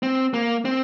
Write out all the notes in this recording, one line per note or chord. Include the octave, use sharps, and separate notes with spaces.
C4
A#3
C4